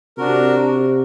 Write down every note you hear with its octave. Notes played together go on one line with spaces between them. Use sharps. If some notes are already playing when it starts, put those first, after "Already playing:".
C3 D4 F#4 A#4